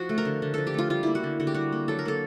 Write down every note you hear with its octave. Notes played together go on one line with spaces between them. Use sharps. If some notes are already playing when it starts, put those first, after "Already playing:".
Already playing: F3 F#4
A3
A#4
D3
D3
F3 A4
G4
A3 F4
G3 F4
A#3 E4
F#4
D3
D3 F#4
G4
G3 F#4
A#3
F#3 A4
A#4
A#3 A4